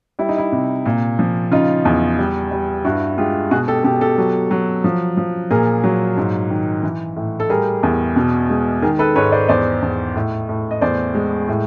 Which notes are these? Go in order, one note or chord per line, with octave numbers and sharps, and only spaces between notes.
G3 E4
D#4
E4
C3
A#2
F3
C#3 D#4 F4
E2
G3
G3
G2 E4 F#4
G#3 F4 G4
B2 F#4 G#4
G4 A4
B2 G4 A4
G4 A4
F#3
F#3
F3
F3
A#2 G#4 A#4
F#3
G#2
D#3
E3
A2
A4
G3 G#4 A#4
E2
B2
G#3
D#3 G#4 A#4
A4 B4
G#2 B4 C#5
C5 D5
E2 C5 D5
E2
A2
A2
D#5
E2 C5 D5
G#3
A2